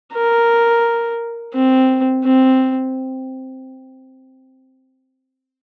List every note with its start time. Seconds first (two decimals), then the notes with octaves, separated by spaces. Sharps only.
0.13 A#4
1.54 C4
2.25 C4